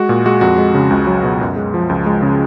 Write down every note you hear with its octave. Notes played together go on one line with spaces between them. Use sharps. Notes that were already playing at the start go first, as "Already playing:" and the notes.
Already playing: G#3 F#4
A#2
G#3 F#4
F2 F#4
G#3
C#3
C#2
F#3
B2
F#2
G#3
F3
C#2
G#3
C#3